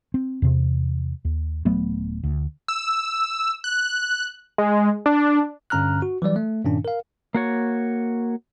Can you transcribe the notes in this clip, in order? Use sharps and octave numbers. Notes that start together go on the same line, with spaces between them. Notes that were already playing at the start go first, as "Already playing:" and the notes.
C4
E2 C3
D#2
D#1 F#3 A3 B3
D2
E6
F#6
G#3
D4
G2 D3 C#4 A#5 F6 F#6
F#4
E3 F#3 G3 D5
A3
G2 A#2 D#3 C#4 D4
A#4 F5
A#3 F#4 C#5